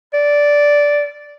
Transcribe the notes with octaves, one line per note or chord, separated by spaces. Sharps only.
D5